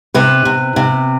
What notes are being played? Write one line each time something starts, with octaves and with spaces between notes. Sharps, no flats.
C3 B4
C3
C3